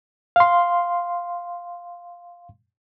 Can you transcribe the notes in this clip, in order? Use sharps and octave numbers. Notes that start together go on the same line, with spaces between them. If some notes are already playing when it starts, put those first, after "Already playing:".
F5 C6